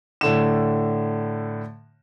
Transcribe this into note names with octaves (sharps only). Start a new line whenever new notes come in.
A2 D3 E7